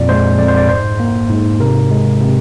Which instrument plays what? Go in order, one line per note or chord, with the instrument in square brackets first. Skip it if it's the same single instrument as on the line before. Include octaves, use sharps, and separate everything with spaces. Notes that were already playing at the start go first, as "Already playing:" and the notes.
Already playing: [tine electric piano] F2 A#2 D5
G#3 C5
F2 D5
C5
D5
G#2 C5
A#3
G#2
C3 A#4
G#3
C3